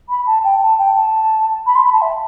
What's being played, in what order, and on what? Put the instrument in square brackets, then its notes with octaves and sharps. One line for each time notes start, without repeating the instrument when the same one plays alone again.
[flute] B5
A5
G5
A5
G5
A5
B5
C6
B5
A5
E5